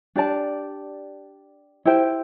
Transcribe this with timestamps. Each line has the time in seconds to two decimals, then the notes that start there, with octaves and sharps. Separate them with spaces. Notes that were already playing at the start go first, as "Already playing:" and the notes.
0.16 D4 G4 D5 A5
1.85 E4 G4 C5 G5